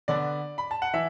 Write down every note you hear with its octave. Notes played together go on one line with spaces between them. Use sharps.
D3 B3 D4 D5
B5
A5
F#5
E3 E5